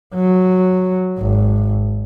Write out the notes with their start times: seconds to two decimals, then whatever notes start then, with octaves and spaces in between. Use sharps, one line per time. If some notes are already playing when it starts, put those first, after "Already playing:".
0.14 F#3
1.19 G#1